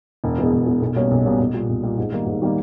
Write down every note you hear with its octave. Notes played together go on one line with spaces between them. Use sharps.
E1
E2 B2 G#3
E1
E2 B2 G#3
B1
B2 G3 A#3 C#4
B1
B2 G3 A#3 C#4
B1
A#2 G3
B1
A#2 G3
G#2
D#3 G3 A#3
G#2
D#3 G3 A#3